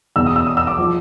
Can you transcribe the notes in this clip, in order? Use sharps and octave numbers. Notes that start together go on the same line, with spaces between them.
E2 B2 E6
D#6
E6
D#6
E6
D6
F3